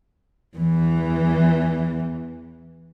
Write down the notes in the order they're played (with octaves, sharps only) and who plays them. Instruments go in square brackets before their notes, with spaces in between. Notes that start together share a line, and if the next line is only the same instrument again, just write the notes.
[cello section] E2 E3